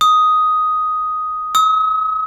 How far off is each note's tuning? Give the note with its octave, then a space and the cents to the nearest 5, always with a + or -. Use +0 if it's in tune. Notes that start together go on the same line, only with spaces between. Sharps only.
D#6 +5
D#6 +45